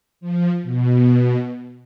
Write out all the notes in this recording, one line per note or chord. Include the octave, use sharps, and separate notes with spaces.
F3
B2